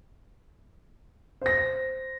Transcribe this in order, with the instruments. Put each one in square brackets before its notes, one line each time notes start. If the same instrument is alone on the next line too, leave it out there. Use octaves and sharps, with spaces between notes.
[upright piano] C5 A#6